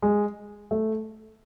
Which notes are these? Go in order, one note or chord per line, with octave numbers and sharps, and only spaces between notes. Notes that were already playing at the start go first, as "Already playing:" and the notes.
G#3
A3